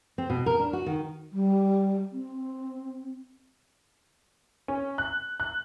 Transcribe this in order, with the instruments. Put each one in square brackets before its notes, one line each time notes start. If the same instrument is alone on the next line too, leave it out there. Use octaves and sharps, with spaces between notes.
[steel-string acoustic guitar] C4
B2
A#4
D4
F#4
D#3
[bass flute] G3
C4
[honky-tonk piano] C#4
F#6
F#6